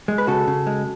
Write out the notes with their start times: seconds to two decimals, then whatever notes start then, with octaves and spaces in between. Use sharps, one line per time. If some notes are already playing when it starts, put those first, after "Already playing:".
0.08 G#3
0.18 B4
0.27 C#3 F#4 A4
0.48 C#3
0.67 G#3